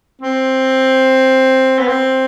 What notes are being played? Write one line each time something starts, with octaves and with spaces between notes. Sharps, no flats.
C4
B3
C4